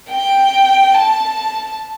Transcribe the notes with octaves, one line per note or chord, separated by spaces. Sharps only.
G5
A5